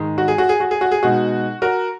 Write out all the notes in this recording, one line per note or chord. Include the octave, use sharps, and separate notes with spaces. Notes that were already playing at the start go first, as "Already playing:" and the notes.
Already playing: G#2 D#3 G#3
F#4
G#4
F#4
G#4
F#4
G#4
F#4
G#4
B2 G#3 D#4 F#4
F#4 A#4